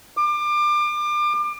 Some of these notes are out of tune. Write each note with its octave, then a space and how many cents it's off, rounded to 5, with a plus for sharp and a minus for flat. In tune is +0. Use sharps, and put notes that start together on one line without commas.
D6 +30